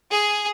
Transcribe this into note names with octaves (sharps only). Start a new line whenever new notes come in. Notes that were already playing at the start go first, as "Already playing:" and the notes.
G#4